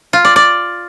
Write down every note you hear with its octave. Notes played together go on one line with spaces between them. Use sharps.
F4
D5
D5